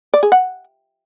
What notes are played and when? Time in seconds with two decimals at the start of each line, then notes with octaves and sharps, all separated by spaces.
0.14 D5
0.23 G#4
0.32 F#5